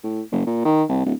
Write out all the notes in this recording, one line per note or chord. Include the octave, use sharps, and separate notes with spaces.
A2
F#1
A#2
D#3
C2
D1